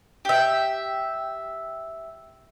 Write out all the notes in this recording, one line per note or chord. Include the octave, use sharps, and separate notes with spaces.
G4 E5